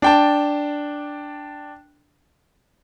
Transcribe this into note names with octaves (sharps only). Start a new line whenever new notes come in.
D4 G5 A5